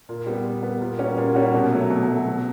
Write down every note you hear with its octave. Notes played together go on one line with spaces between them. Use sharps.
A#2
G3 B3
A#2
G3 B3
A#2
G3 A#3 C#4 F#4
A#2
G3 A#3 C#4 F#4
B2
F#3 A3
B2
F#3 A3
B2